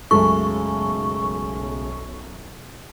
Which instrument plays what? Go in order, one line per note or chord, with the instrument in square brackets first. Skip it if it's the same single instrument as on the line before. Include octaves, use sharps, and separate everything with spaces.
[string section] B1 [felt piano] F#2 A4 [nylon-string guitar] C#3 G#3 A3 [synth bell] C#6